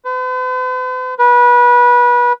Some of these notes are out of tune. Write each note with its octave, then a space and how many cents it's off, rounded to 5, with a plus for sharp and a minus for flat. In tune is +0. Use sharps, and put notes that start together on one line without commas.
B4 +45
B4 -25